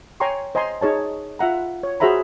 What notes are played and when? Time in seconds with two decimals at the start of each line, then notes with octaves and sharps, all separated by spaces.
0.20 C#5 G5 G#5 A#5 C6 C#6
0.55 C5 D#5 G#5 A#5 C6
0.81 D#4 G#4 C#5 A5
1.39 F4 E5 F#5 A#5
1.83 C#5
2.00 F#4 G#4 C5 E5 A#5 B5